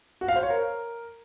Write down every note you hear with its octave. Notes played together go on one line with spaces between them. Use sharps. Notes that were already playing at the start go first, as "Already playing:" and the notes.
F#4
F5
C5
C#5
A#4